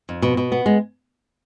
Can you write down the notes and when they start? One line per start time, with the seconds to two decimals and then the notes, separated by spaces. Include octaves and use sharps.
0.09 F2
0.22 B2
0.37 B2
0.52 B3
0.66 G#3